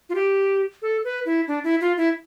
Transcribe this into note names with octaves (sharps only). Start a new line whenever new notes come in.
F4
G4
A4
B4
E4
D4
E4
F4
E4